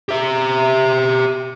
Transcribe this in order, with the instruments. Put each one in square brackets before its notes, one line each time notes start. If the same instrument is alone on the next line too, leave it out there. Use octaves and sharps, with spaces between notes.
[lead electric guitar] G4 E5